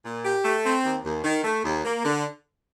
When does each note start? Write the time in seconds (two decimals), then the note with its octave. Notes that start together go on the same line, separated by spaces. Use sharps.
0.04 A#2
0.23 G4
0.44 A3
0.64 C4
0.84 D#2
1.04 D#2
1.24 D#3
1.44 A3
1.64 D#2
1.85 A#3
2.05 D3